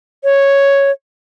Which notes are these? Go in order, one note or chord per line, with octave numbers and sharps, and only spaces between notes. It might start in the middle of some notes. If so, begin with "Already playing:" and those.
C#5